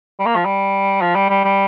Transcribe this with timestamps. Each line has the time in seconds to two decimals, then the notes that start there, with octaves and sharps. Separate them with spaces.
0.19 G3
0.26 A#3
0.36 F3
0.45 G3
1.02 F3
1.15 G3
1.29 G3
1.44 G3